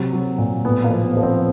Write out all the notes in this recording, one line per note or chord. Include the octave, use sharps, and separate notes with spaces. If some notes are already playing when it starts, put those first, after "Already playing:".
Already playing: C3 F#3
F#3
A#2
A2 B3
A#3
F3
B3
F3
C4